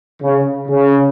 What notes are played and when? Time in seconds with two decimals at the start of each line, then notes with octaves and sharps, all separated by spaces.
0.22 C#3
0.68 C#3